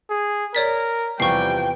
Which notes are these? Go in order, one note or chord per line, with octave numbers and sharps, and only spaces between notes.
G#4
A#4 C#5 D5 B6
E2 C3 F3 G3 G5 C#6 C7